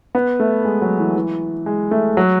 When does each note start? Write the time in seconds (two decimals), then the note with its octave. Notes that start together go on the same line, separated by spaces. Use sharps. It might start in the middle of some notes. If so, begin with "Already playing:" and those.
0.15 B3
0.40 A3
0.65 G#3
0.82 F#3
0.98 E3
1.16 E3
1.66 G#3
1.91 A3
2.17 F#3